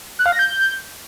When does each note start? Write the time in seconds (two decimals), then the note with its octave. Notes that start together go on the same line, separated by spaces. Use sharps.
0.19 F#6
0.26 F5
0.32 A#6
0.39 G6